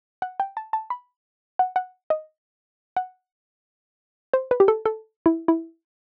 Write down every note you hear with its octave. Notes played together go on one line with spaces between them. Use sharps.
F#5
G5
A5
A5
B5
F#5
F#5
D#5
F#5
C5
B4
G4
A4
A4
E4
E4